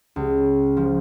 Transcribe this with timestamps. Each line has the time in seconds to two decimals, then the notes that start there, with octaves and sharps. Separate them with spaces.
0.16 C#2
0.77 F3